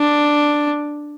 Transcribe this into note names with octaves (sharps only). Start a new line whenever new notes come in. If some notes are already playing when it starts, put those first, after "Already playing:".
Already playing: D4